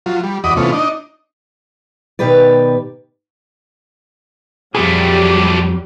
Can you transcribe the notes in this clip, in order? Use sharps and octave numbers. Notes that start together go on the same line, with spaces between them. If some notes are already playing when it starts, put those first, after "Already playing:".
F#3 F4
G3
E2 F#4 D5 D#5 B5 D#6
C3 E3 A3 B3 C#4 F4
D4 D#4 D#5
B2 D#3 G4 B4 D5
F2 A#2 F#3 G3 A3 G4 G#4